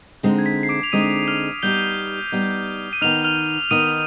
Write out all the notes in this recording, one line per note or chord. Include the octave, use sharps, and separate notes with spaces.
D3 G#3 C4 D#4
G#6
B6
C7
D6 D7
F7
D3 G#3 C4 D#4 D#6 D#7
F6 F7
G3 B3 D#4 G4 G6 G7
G3 B3 D#4 G4
D#7
D#3 B3 D#4 F6 F7
F6 F7
D#3 B3 D#4 D#6 D#7